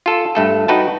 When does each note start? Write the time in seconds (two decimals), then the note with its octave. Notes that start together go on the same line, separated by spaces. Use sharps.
0.06 F4 A4
0.35 G2 A3 A4
0.68 D#4 F#4 B4 G5 A5